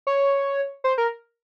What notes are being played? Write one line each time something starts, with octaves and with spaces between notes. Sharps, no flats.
C#5
C5
A#4